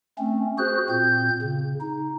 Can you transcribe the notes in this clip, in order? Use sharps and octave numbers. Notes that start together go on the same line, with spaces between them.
A3 C4 C#4
F#4 G#4 C5 F#6
A#2 C4 G6
C#3
D#4